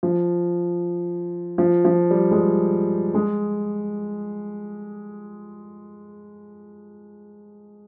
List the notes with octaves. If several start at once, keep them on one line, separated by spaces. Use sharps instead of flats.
F3
F3
F3
G3
G#3
G3
G#3